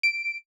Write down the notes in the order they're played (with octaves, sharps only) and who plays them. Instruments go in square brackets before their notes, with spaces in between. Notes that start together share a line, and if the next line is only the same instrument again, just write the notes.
[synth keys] D7